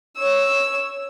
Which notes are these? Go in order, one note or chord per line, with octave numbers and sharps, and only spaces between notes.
C#5 E6